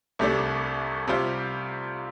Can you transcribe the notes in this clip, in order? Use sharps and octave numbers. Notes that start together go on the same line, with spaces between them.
C2 C3 A3 D4
C3 G3 F4 C5